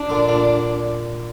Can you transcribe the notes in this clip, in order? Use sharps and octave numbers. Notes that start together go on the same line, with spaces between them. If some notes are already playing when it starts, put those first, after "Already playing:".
Already playing: D4
A#2 D3
A#2 D3